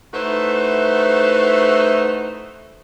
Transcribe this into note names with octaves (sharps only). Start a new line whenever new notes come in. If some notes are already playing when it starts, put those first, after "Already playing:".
A3 D#4 E4 F#4 B4 C5